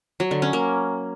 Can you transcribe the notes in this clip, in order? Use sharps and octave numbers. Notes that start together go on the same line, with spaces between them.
F#3
D3
C#4
A#3